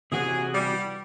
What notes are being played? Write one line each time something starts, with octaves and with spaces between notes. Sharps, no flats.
C3 E3 F#4 G#4
G3